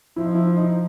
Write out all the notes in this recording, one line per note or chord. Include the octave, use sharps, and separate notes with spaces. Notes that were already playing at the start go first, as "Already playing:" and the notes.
F3 E4
D#4
E4
D#4